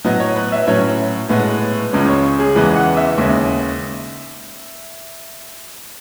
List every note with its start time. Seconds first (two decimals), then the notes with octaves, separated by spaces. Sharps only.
0.04 A2 F#3 B3 D#5
0.20 C#5
0.36 B4
0.52 E5
0.67 A2 F#3 C#4 C#5
1.29 A2 G#3 B3
1.93 C#2 C#3 G#3 C#4
2.09 C#5
2.39 G#4
2.55 E2 C#3 E3 G#3 B3 B4
2.76 F#5
2.97 E5
3.17 D#2 C#3 G#3 E5